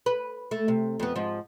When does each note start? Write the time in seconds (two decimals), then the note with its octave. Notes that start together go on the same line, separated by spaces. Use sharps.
0.06 B4
0.51 A3
0.68 C3
1.00 F2 B3
1.16 G#2 F3